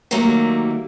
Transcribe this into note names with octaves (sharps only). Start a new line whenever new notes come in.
D#3 F#3 G3 A3 A#3